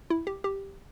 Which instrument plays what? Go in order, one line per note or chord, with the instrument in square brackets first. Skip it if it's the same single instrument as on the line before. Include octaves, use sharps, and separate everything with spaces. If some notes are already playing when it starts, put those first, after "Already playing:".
[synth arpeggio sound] E4
G4
G4